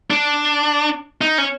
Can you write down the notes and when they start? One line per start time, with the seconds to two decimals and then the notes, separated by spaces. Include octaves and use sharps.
0.10 D4
1.21 D#4
1.38 C#4